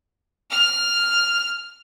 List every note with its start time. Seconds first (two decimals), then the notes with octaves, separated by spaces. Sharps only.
0.50 F6